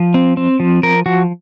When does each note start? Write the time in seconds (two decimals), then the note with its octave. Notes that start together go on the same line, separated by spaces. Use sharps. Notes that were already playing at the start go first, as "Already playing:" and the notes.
Already playing: F3
0.14 C4
0.37 C4
0.60 F3
0.83 F3 A#4
1.06 F3 F#4